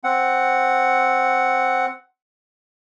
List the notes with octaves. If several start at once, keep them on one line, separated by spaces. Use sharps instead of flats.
C4 F#5